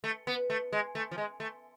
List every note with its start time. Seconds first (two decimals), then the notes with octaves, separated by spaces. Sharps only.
0.04 A3
0.27 B3
0.50 A3
0.72 G#3
0.95 A3
1.11 F3
1.18 G#3
1.40 A3